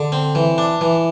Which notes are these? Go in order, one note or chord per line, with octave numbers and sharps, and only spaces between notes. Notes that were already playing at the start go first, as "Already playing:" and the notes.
Already playing: D3
C4
E3
D4
E3